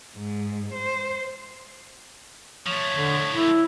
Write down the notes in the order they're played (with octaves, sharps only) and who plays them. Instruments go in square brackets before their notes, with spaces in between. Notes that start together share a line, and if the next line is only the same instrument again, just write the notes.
[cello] G#2
C5
[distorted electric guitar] F3 A3 [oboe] C#5
[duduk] D3
E4